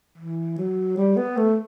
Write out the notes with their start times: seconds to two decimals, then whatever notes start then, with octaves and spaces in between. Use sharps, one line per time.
0.18 E3
0.57 F#3
0.97 G3
1.16 B3
1.37 A3